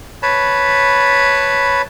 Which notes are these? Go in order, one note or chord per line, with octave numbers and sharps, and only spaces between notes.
B4 C#5 A5 B5